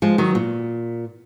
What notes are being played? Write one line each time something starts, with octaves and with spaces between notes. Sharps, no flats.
F3 G#3
D#3 F#3
A#2